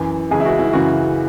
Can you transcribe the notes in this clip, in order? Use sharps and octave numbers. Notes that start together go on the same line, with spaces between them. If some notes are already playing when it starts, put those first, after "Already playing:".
Already playing: F#2 E3
C#2 C#3 E3 G#4
E4
F#4
E4
F#2 C#3 E3 F#4